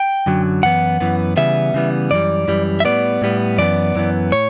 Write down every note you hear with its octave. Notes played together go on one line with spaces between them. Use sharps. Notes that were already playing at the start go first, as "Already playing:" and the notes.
Already playing: G5
F#2 D3 F#3
F#2 E3 B3 F#5
F#2 E3 B3
C#3 E3 G3 B3 E5
C#3 E3 G3 B3
F#2 E3 G3 D5
F#2 E3 G3
E5
A2 G3 B3 D5
A2 G3 B3
F#2 E3 B3 D5
F#2 E3 B3
A2 C#5